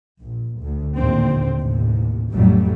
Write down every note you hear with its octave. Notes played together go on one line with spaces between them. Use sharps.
A#1
D2
A#1 D#2 A2 D3 C4
A1 D#2 C3
A1 F2 F#3 G3 A3